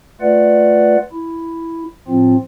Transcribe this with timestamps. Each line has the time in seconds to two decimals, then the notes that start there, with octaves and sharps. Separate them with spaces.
0.21 A3 F4 B4 D5 F#5
1.12 E4
2.08 A2 F3 C4 F4